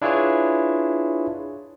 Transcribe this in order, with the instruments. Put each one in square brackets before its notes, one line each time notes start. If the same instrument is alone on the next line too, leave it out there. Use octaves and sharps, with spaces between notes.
[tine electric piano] D4 E4 F4 G#4 B4 C#5